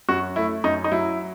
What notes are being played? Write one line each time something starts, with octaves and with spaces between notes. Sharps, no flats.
F#2 F#4
A3 E4
F#2 D#4
D#4
F#3 E4